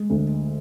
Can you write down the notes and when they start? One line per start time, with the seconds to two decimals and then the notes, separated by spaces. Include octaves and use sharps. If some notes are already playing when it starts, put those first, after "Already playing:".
Already playing: G#3
0.10 D2